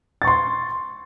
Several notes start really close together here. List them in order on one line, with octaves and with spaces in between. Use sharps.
A6 C#6 C6